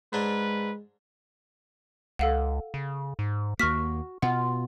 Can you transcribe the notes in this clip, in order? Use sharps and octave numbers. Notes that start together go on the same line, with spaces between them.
G#2 G#3 D4 B4
C#2 A4 F5 F#5
C#3
G#2
D#2 A#3 F#4 C#6 F6 B6
B2 F4 F#5